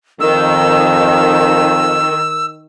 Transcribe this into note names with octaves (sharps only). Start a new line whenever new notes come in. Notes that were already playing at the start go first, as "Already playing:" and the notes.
F2 D#3 E6